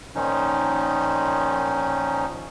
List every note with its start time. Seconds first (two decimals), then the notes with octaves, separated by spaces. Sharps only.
0.15 A#2 D#3 F3 C#4 D#4